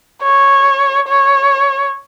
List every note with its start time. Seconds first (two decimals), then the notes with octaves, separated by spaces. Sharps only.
0.23 C#5
1.08 C#5